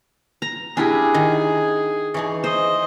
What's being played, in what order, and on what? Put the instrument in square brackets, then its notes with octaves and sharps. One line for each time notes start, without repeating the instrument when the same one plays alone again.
[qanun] A#5
[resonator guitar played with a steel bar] C3 C#4 G#5 [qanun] D4 E4 G4 [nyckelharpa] G#4
[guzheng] D#3
[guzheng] E3 D#4 [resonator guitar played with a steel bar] G#4 C#5
[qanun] C5 [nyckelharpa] D#5